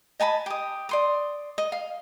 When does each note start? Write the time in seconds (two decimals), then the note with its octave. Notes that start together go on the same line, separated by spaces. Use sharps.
0.20 D#5 G#5 A5 B5
0.46 G4 D#6
0.89 D5 C6 D#6
1.58 D#5
1.72 F5